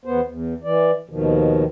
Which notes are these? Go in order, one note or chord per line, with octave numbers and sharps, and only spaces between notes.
E2 B3 C5
E2
E3 D5
D#2 B2 D#3 F3